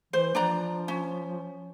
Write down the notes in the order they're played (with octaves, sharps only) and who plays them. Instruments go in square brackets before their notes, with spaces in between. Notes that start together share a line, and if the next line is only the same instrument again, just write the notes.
[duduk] E3 [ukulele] C5
[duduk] F3 [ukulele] D4 D5 A#5
[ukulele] C#4